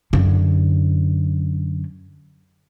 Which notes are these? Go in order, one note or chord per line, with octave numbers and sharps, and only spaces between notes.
F#2 D3